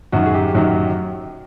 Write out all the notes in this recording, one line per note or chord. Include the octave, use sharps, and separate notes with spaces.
F#2 D#3 F#3 F#4
G#4
G4
F#2 D#3 F#3